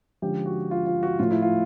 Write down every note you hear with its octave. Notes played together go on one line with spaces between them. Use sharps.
D3 F3 G#3 C#4 G4
F#4
F4
F4
F#4
A2 F3 A3 F4
E4
F4